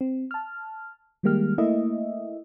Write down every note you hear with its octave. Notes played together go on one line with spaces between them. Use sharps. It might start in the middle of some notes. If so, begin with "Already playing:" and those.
C4
A5 F6
D#3 G3 G#3 A#3 G4 F6
A3 A#3 E4 D#5 E5